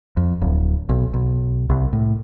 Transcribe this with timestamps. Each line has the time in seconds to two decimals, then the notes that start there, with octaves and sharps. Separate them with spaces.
0.17 F2
0.41 D1
0.89 B1
1.14 B1
1.70 C2
1.93 A2